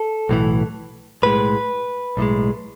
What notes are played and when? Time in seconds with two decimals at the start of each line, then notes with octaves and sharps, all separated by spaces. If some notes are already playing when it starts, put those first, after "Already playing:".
Already playing: A4
0.29 B1 A2 E3
1.22 B1 A2 G#3 B4
2.17 B1 A2 G#3